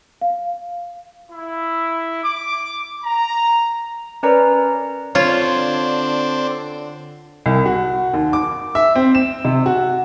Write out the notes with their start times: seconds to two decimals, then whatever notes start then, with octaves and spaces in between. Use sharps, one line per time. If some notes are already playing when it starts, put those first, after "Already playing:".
0.21 F5
1.32 E4
2.24 D6
3.04 A#5
4.23 C#4 A#4 B4 C#5 D5 A#5
5.15 D3 C4 D4 F4 C#5
7.46 C2
7.66 F#4
8.13 D#2
8.33 D6
8.75 E5
8.96 C4
9.15 E7
9.44 C3
9.66 F#4